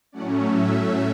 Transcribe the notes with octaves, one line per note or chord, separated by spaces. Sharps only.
A2 F#3 A3 C#4 D5 F#5
E5